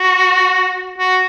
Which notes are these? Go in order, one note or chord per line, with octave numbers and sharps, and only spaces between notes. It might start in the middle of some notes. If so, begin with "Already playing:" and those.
Already playing: F#4
F#4